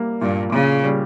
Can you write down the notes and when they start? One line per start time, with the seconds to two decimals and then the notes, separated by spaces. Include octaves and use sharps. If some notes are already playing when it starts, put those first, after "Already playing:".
Already playing: G3 A#3
0.21 G2 A#2
0.52 A#2 C#3
0.83 G3